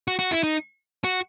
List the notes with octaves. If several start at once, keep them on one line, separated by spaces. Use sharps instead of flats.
F#4
F#4
E4
D#4
F#4